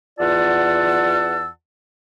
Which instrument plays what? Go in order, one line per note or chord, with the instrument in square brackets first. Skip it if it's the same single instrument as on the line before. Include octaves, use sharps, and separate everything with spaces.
[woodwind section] E2 F4 D5 F#5 A5 E6